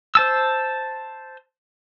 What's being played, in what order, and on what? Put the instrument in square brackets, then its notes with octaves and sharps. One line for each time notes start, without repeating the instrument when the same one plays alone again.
[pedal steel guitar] C5 A5 E6